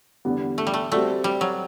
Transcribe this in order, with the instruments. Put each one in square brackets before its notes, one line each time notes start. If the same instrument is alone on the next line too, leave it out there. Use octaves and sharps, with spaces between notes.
[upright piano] E2 D3 G3 B3
[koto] A3
G3
A3
[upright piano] G3 C4 F#4 A4 D5 [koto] A3
[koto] G3
F#3